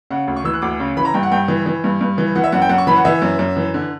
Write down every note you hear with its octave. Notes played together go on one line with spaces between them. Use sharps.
C#3 F#5
D2
C#6
E3 E6
F#6
D2 D6
C#3
E3 B5
A#5
G2 G5
F#5
G2 G5
E3
E3
G2
G2
E3
E3 F#5
E5
F#2 F#5
G5
F#2 F#5
C#6
E3 B5
F#5
E3 E5
F#2
F#2
E3
D3